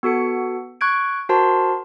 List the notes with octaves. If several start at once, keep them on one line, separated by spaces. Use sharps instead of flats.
B3 F#4 A4 C#7
C#6 F#6 G#6 D7
F#4 A#4 C5 A5 C6